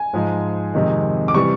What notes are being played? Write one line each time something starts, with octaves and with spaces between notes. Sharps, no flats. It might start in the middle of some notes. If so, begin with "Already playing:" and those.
Already playing: G#5
G#2 F3 G#3
F2 C3 D#3 G#3
D6
C3 E3 G3 C#6